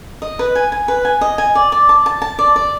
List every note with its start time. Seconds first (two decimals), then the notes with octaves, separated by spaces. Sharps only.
0.22 D#5
0.39 B4
0.55 G#5
0.72 G#5
0.88 B4
1.05 G#5
1.21 D#5
1.38 G#5
1.55 D5
1.72 D5
1.89 A5
2.06 A5
2.22 A5
2.39 D5
2.56 D5